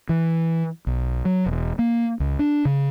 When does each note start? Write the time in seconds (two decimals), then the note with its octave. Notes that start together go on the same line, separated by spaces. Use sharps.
0.09 E3
0.87 B1
1.25 F#3
1.46 E1
1.79 A#3
2.20 C#2
2.39 D4
2.65 C#3